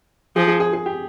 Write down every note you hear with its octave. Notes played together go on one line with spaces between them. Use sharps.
F3 G#4
G#4
G#4
G#4
G4